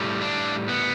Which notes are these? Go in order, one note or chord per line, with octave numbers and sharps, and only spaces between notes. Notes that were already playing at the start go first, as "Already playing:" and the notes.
Already playing: A2 G3
D4
B3